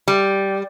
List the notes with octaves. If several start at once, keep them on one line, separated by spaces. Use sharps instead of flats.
G3